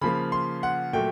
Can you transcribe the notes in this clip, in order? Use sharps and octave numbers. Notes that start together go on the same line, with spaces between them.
C#3 F3 A#3 B5
C6
F#5
A#2 F#3 A3 G5